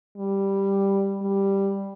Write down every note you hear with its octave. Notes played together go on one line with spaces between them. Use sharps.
G3
G3